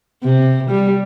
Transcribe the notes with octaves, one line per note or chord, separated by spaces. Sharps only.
C3
G3